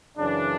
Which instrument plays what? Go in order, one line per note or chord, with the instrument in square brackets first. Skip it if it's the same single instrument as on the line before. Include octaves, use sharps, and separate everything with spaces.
[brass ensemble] F#2 C#3 E3 D4